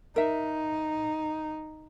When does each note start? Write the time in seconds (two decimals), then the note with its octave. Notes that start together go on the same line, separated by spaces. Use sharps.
0.16 D#4 A#4 E5